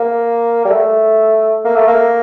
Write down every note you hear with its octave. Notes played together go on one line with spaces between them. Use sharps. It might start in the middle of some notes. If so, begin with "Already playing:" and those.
Already playing: A#3
G3
A3
A#3
A3
A#3